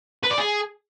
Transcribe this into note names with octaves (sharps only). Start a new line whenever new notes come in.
B4
D5
G#4